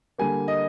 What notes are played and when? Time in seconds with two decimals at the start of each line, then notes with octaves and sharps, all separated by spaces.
0.18 D3 G3 A#3 G#5
0.48 D#5